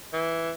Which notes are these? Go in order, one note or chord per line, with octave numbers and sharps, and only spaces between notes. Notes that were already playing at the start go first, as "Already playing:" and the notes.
E3